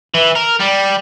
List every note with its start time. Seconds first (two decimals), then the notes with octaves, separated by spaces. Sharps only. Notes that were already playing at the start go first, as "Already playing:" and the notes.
0.14 E3
0.35 A#4
0.60 G3